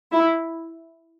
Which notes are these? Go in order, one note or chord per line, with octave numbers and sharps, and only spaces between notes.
E4